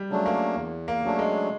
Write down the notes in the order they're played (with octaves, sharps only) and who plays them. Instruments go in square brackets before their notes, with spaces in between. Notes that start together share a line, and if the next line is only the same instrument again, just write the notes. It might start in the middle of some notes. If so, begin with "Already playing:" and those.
Already playing: [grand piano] G3
[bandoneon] C#3 F#3 A3 D4
[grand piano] A#3
[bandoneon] E2
[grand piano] A#3
[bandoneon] C#3 F#3 A3 D4
[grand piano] G#3